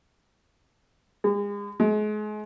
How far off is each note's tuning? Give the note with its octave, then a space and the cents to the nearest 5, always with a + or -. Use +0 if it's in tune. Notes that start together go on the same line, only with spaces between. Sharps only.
G#3 -35
G#3 +35